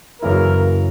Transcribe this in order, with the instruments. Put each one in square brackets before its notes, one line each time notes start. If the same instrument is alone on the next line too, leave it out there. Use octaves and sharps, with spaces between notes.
[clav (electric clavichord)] F#2 C#3 E3 A#3 E4 [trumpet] A#4